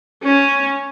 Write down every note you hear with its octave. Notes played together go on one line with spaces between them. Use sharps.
C#4